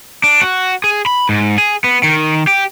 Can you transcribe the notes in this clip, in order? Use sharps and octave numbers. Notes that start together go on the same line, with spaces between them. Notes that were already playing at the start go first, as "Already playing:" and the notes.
D4
F#4
G#4
B5
G#2
G#4
B3
D#3
G4